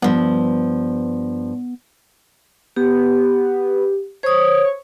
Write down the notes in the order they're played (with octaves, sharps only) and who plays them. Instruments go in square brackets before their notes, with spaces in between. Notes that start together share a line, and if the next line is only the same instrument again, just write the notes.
[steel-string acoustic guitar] G2 F3 [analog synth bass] B3
[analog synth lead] B3 [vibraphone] G4
[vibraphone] C5 D#6 [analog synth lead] C#5